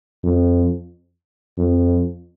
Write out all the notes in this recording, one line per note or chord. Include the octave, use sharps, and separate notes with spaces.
F2
F2